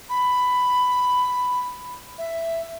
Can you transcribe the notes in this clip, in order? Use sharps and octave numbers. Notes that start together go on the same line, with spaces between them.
B5
E5